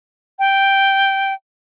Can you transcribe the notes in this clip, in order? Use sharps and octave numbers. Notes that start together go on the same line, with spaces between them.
G5